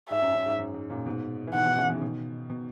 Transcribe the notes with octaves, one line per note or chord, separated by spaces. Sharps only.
G#2 E5
F#2
F#2
G#2
F#2
G#2
F#2 A#2
G#2 B2
E3
B2 D#3 F#5
B2 D#3
C#3 E3
B2 D#3
C#3
B2 D#3
B2